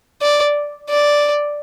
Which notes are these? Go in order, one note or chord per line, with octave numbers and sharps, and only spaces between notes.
D5
D5